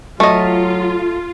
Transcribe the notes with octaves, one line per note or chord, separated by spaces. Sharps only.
F#3 A3 F4 D#5